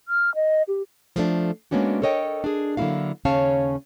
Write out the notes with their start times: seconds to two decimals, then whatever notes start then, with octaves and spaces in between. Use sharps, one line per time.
0.08 F6
0.35 D#5
0.68 G4
1.16 F3 A3 D4
1.71 G#3 A#3 B3 C#4 D4 F#4
2.02 A4 A#4 C#5 D#5 G5
2.44 D4 G#4
2.77 D3 F#3 A#3 E4 F#4 F5
3.25 D#2 C#3 C#4 C#5 F5 A5